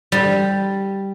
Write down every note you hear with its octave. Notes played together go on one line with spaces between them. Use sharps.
G3